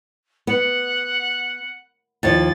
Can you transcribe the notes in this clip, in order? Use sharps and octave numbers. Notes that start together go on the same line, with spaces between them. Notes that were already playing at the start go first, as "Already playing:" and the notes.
B3 F#5
D#2 F3 A6